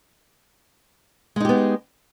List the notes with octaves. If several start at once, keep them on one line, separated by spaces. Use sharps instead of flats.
G#3 B3 D#4 G4